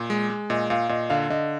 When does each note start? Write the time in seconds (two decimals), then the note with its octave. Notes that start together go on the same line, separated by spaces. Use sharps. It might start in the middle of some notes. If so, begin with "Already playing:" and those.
Already playing: A#2
0.10 G#3
0.30 G#3
0.50 A#2 D#5
0.70 A#2 F5
0.89 A#2 D#5
1.10 D3 F5
1.30 D3 D#5